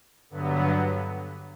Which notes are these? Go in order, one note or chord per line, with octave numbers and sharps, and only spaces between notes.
G2 D3 F#3 B3